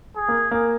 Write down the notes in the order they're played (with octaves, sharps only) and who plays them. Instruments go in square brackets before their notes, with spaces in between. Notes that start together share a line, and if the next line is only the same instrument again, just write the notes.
[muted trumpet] G#4
[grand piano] A#3
A#3